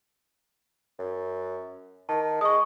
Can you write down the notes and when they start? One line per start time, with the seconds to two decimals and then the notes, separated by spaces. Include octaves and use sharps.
0.99 F#2
2.09 D#3 A5
2.41 G#3 C#6 D#6